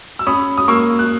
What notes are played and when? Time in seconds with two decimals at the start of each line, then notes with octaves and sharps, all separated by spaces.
0.19 E6
0.27 C#4 B5 D#6
0.58 D#6
0.68 A#3 C#6 E6
0.99 F#6